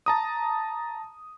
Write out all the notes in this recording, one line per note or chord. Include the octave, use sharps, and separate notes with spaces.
A5 A#5 D#6